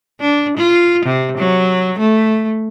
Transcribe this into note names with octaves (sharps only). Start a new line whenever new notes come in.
D4
F4
C3
F#3
A3